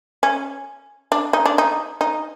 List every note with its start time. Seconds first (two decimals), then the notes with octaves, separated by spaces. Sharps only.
0.23 C#4
1.12 D4
1.33 D#4
1.46 D4
1.58 D#4
2.01 D#4